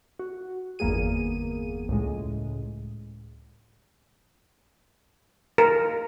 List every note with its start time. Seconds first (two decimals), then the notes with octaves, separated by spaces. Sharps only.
0.19 F#4
0.79 G1 E2 A#3 B3 G#4 D#7
1.89 C#2 A2 G#3
5.58 A#4